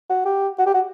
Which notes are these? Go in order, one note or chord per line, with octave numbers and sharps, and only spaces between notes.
F#4
G4
F#4
G4
F#4